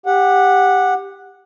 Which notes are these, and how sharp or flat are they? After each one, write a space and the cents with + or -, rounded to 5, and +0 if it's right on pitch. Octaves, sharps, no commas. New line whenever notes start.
G4 +15 F#5 -10